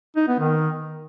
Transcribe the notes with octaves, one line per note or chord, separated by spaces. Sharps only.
D#4
B3
D#3